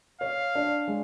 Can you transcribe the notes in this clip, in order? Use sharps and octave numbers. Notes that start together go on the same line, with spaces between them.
C#5 F5
D4
G#3